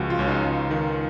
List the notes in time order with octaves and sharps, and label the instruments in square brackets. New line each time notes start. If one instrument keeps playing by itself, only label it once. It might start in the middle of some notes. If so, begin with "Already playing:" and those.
Already playing: [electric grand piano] C#2 F3 F#4
F4
C#2 C#4
D#4
C#2
D#3